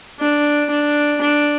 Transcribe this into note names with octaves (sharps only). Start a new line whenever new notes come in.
D4
D4
D4